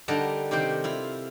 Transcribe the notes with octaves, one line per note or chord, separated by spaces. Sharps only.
D3 G3 D#4 A#4 F#5 A5
C3 D#3 G4 C5 G5
E4 F4